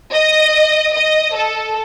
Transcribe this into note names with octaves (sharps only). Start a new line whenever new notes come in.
D#5
D#5
A4